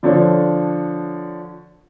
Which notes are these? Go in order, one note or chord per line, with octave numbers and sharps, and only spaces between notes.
D3 F3 D4 A4 C#5